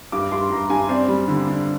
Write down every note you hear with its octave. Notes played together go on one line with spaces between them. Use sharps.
G2 D6
G2 C6
G2 A#5
G2 G#5
C4 D5
G3
D3
D3